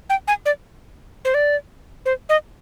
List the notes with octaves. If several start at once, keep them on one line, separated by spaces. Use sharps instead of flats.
G5
G#5
D5
C5
D5
C5
D#5